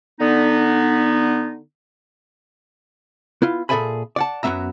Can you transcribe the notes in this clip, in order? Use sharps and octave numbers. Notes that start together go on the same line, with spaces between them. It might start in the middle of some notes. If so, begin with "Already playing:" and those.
D3 B3 D#4
B3 E4 F4
A#2 G#4 A4 E5 G#5 B5
D5 F#5 A5
F#2 F#3 A#3 B3 E5 A#5